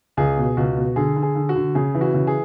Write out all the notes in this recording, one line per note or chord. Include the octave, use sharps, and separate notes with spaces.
C#2 G#4
B2
C#2 F#4
B2
D3 G#4
D3
G#4
D3
F#4
D3
C#3 G#4
E3
F#4
C#3
G#4